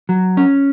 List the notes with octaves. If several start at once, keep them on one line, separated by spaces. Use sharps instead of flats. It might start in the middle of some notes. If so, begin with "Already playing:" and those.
F#3
C#4